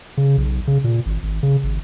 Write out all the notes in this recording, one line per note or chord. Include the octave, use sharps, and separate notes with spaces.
C#3
B1
C#3
A#2
G#1
G#1
C#3
G#1